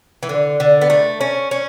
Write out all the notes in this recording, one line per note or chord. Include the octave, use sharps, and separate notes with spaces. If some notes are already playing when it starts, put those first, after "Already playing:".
E3
D3
D3
B3
A3
C#4
C#4